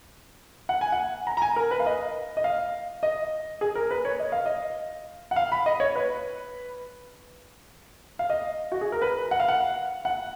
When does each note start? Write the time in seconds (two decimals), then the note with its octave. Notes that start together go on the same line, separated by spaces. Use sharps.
0.69 F#5
0.81 G#5
0.92 F#5
1.27 A#5
1.37 A#5
1.42 G#5
1.56 A#4
1.71 B4
1.80 F5
1.86 D#5
2.37 D#5
2.44 F5
3.03 D#5
3.61 G#4
3.75 A#4
3.91 B4
4.05 C#5
4.19 D#5
4.32 F5
4.46 D#5
5.31 F#5
5.36 F5
5.52 B5
5.66 D#5
5.80 C#5
5.95 B4
8.19 F5
8.30 D#5
8.72 F#4
8.81 G#4
8.92 A#4
9.02 B4
9.31 F#5
9.40 F5
9.48 F#5
10.05 F#5